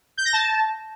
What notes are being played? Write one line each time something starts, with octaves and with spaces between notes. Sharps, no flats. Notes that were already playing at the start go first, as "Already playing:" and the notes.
G6
A#6
A5